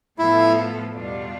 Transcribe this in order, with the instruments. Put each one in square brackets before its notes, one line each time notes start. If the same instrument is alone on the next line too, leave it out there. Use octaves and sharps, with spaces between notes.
[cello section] A2 F3 B3 F4 A4 [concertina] E4
[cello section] E2 B2 G3 D4 F4